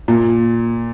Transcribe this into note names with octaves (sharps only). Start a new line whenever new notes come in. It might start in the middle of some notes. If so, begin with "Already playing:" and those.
A#2